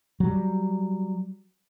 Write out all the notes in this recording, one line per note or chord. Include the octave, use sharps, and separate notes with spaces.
F#3 G3